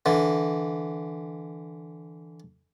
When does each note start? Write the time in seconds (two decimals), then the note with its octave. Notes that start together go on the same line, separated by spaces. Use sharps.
0.06 D3 E3